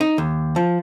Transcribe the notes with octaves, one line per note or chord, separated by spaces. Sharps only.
D#4
D#2
F3